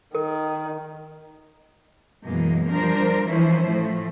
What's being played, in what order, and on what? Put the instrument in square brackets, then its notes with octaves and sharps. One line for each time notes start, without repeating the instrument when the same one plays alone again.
[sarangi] D#3 [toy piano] A#4
[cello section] F#2 B2 E3 G#3 A#3
F3 G3 D4 A#4 C5
E3 F3 C#4 E4 C5
A2 F3 A3